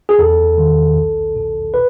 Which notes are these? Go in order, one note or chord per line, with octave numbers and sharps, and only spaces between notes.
G#4
E2 A4
D#3
B1
B2
B4